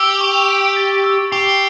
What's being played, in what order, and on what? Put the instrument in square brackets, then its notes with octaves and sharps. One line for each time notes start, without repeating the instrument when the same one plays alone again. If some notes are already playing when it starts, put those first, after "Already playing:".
Already playing: [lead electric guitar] G4 [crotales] E6
[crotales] C#6
D7
A6
E6
[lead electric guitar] G4 [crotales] C7